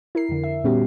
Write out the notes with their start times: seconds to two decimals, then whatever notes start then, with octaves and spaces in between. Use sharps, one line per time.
0.15 E4 A#4 C7
0.29 F2 D3
0.44 E5
0.64 A#2 G3 B3 C#4 F#4 G4